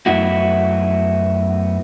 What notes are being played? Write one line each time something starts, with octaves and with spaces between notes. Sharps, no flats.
F#2 A3 B3 E4 F#4